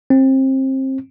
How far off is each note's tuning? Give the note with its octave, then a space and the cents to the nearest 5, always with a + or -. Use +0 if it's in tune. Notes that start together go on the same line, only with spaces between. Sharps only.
C4 +25